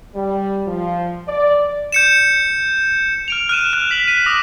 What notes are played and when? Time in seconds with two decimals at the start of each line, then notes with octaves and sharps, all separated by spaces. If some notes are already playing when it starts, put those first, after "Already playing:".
0.14 G3
0.67 F3
1.28 D5
1.92 G6 C#7 E7
3.28 F6 D7 F7
3.49 F6 F#6 D#7 E7
3.73 F6 F#6
3.91 B6 F#7
4.07 B6 D#7
4.26 D6 D#6 A#6